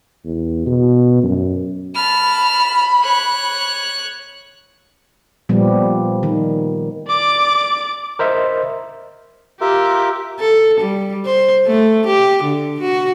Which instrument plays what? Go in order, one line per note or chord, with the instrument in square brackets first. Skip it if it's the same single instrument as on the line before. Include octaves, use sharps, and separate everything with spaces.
[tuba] E2
B2
F#2
[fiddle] A5 F6 [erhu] B5
[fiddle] C#5 F#6
[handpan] A#2 F3 G3 B3
D#3
[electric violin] D5 D6
[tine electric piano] A#4 C5 D#5 E5
[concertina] F4 A#4 E5 [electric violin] G4
[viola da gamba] A4
G3
C5
A3
G4
D3
F#4